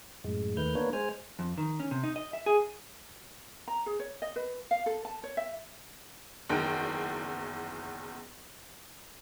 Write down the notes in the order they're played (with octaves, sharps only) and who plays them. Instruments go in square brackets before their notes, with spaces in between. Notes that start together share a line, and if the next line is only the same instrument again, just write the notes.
[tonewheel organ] F#2 A2 G#3
D#2 D#3 A3 B4 F6 G6
A#3 B3 D4 A#4 B4 C#5
G#3 C5 G#5 F6
[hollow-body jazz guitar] F2
D#3
C#4
C3
D#4
D#5
E5
G#4
[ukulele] A#5
G#4
C#5
D#5
B4
F5
A4
A5
C#5
E5
[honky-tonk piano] F#1 E2 D#3 G5